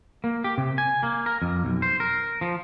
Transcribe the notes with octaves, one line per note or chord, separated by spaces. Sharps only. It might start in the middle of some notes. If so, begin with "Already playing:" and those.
A#3
G4
C3
G#5
A#3
A#4
F2
B1
C5
A#4
F3